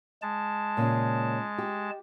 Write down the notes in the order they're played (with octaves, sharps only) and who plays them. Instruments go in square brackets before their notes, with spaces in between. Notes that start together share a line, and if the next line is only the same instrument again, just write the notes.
[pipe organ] G#3 A5
[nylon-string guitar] A#2 C#3
G4